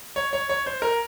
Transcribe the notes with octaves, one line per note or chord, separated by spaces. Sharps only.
C#5
C#5
C#5
C5
A#4